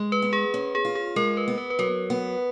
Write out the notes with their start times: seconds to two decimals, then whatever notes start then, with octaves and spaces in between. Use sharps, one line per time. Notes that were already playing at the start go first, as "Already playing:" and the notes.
Already playing: G#3
0.12 B4
0.22 B3
0.33 G#4
0.54 C#4
0.75 G#4
0.85 F4
0.95 G#4
1.16 G#3 A#4
1.37 B4
1.48 B3
1.58 B4
1.70 B4
1.79 F#3 A#4
2.10 B3